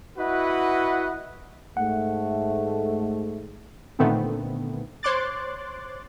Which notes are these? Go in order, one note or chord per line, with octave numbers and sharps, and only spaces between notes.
E4 F#4 B4 D#5 F#5
G#2 A3 F#5
A#2 D3 D#3 A3 B3 C4
C5 C#5 C6 D6 F#6 A6